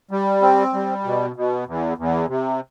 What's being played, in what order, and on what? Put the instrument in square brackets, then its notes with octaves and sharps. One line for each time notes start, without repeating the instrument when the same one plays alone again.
[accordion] G3
C4
G3
B2
B2
E2
E2
C3